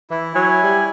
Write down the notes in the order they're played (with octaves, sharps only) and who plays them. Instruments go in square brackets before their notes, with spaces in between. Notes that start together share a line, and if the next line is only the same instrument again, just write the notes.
[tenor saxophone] E3 [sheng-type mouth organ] E4
[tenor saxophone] F#3 [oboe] G#5
[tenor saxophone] G3